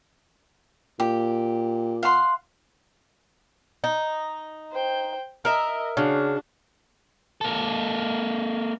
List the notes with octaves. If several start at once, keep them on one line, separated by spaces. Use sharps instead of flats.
A#2 G4
F5 F#5 C6
D#4
C5 G5
A#4 D#5 E5
C#3 D4 F#4
A#3 A4